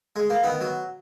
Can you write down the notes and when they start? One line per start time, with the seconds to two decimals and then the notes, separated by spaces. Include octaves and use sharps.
0.16 G#3
0.30 A#3
0.44 D#3 B3
0.61 F#3